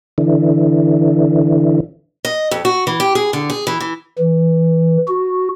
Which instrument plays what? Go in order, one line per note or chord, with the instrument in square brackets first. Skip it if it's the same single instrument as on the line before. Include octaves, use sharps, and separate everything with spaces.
[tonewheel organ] D3 E3
[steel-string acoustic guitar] D#5
F2
F#4
E3
G4
G#4
D3
G#4
E3
E3
[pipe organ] E3
F#4